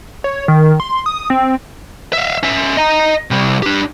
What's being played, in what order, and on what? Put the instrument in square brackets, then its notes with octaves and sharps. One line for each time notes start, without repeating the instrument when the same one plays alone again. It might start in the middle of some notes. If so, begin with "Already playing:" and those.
[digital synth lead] C#5
D#3
C6
D#6
C4
[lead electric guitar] E5 F5
C#4 E5
D#5 A#5
C3 G3
D4 G4